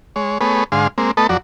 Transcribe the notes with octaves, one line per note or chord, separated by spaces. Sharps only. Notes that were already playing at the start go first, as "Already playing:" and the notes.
G#3 C#5
A3 B3 G#4 B4 C#5
G#2 D3 G#4 F5 C6
G#3 A#3 C4
A3 B3 A4 B4 D#5 A5
F2 F#3 F#4 D5